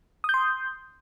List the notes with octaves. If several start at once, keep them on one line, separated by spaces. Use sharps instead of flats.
C6 D#6 G6